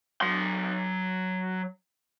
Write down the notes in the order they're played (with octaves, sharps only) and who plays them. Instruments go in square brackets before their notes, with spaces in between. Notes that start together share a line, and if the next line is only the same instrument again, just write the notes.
[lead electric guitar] F#3 C6